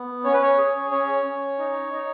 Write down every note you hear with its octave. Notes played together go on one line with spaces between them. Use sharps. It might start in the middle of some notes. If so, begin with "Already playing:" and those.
Already playing: B3
C#4 C#5
B4
C#5
G#4
C#4 C#5
C#4
D#4
D#4